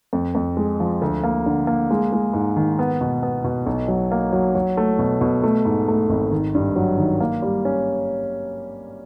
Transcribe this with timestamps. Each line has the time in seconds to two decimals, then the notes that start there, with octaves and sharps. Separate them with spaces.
0.13 F2
0.35 F2
0.57 G#3
0.80 F3
1.02 D2
1.24 A#3
1.46 D3
1.67 A#3
1.91 G#3
2.12 G#3
2.34 G#2
2.56 D#3
2.79 B3
3.01 B2
3.23 B3
3.44 B2
3.66 B1
3.88 F#3
4.12 A#3
4.33 F#3
4.55 F#3
4.77 A3
4.99 B2
5.21 B2
5.43 A3
5.65 G#2
5.88 A3
6.09 G#1
6.31 D#3
6.55 G2
6.76 F#3
6.98 D#3
7.20 A#3
7.42 G3
7.65 C#4